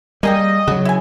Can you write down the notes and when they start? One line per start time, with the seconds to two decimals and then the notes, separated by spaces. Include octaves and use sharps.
0.23 G3 A#3 G#4 D#5 G5
0.68 C#3 F#3 F#4
0.85 E4 G#5